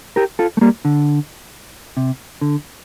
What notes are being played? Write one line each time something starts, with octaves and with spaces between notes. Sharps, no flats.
G4 A#4
F4 A4
A3
G3 A#3
D3
C3
D3